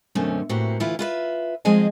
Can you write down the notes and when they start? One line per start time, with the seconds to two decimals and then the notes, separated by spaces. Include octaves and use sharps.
0.15 F#2 B2 D3 A3 C4 C#4
0.49 A2 E3 A#3 C4 F#4 G4
0.80 D2 E3 E4 F4 B4
0.99 F4 B4 E5
1.65 F3 G#3 C4 G#4 D#5 G#5